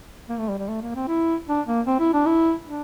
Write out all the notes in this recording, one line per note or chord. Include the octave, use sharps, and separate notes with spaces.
A#3
A3
G3
G3
A3
A#3
C4
E4
D4
A#3
C4
E4
D4
E4
D4